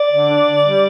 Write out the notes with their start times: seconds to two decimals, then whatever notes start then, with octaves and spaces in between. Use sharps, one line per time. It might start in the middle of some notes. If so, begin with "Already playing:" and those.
Already playing: D5
0.10 D3
0.28 D4
0.45 D3
0.63 G3